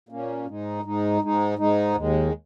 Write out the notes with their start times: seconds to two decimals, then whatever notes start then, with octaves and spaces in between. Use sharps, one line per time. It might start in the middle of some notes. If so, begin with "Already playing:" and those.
0.09 A#2 A#3 C#4
0.46 G#2 G#3 D#4
0.83 G#2 G#3 D#4
1.21 G#2 G#3 D#4
1.58 G#2 G#3 D#4
1.95 D#2 D#3 G#3